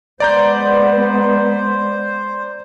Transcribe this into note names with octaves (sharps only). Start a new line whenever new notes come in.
G#3 B3 C5 D5 A#5 G6